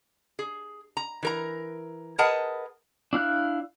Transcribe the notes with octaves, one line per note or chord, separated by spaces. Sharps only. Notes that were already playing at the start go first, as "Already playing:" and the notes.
G#4
A#5
E3 A#4 A#5
G#4 A#4 B4 D#5 F#5 A5
D4 E4 F5 F#6